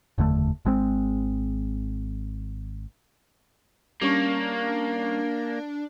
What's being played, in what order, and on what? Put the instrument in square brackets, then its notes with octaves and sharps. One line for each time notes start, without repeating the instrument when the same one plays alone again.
[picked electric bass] F#1 E2 D3 A3
G#1 G#3 C4
[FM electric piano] G3 C#4 C#6 [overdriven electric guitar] A#3 [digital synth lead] D4